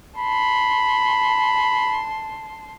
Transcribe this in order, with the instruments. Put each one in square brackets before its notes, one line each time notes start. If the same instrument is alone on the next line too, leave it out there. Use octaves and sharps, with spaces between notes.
[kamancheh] A5 C6 [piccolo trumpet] B5